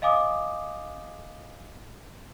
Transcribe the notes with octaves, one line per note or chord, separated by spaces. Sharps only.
D#5 F5 G#5 D6 D#6